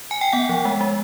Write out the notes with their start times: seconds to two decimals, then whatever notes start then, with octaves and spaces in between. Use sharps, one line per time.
0.11 G#5
0.21 G5
0.33 B3 F#5
0.49 F3
0.65 G#3
0.81 G#3